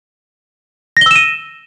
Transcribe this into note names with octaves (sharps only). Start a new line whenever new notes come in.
E6 A#6 D#7 E7 G7